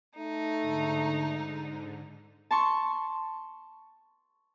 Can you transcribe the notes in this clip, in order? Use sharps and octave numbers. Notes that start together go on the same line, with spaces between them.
A3 D#4
G#2 D3
A5 C6 C#6